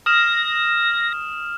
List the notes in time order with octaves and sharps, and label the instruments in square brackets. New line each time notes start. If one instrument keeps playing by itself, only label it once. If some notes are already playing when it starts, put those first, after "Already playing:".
[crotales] D#6 F6 E7 [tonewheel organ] A#6